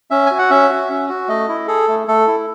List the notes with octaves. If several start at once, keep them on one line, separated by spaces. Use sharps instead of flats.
C#4 E5
F#4 G#5
F#5
C#4 E5
F#4
C#4
F#4
A3 D#5
E4
G#4 A4
A3
A3 A4
E4